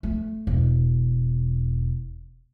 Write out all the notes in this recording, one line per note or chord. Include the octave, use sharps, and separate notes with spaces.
A3
E1